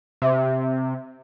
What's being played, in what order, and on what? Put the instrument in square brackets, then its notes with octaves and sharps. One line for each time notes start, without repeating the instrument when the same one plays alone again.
[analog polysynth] C3 [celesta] E5